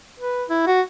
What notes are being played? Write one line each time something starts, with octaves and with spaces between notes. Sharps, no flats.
B4
E4
F#4